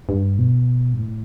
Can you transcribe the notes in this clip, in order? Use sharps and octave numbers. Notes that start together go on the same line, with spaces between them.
G2
B2
G2
A2